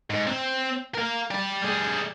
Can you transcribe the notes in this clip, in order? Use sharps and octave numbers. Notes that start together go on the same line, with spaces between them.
G#2
C4
A#4 F5
G4 D5
G3 G#4